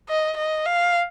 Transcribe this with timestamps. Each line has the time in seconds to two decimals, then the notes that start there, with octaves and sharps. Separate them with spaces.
0.09 D#5
0.37 D#5
0.66 F5